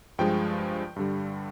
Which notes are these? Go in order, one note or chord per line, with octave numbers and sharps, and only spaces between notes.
G2 F3 G#3 G5
G2 D3 G3